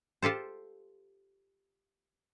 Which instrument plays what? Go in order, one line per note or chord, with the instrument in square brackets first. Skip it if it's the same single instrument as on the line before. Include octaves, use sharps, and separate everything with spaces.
[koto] F4 G4 A4 C5